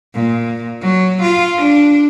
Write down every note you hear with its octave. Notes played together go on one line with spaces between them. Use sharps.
A#2
F#3
F4
D4